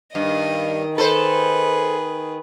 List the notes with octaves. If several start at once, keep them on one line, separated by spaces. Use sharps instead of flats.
G2 D#3 D#5
G#4 A4 B4 C5